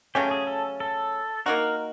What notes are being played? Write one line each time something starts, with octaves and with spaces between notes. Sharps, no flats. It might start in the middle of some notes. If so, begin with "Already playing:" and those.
C#3 F#3 A3 C#4 G4
G#4
A4
A4
A#3 D#4 F#4 A#4